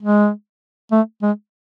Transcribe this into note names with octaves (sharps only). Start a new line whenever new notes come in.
G#3
A3
G#3